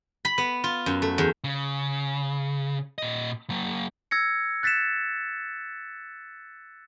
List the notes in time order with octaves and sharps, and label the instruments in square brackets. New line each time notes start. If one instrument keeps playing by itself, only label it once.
[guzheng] B5
B3
F4
F#2
A3
E2
[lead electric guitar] C#3
A#2 D#5
F#3 A#3
[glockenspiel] E6 G#6 A#6 C#7
F#6 A6 B6 C#7 E7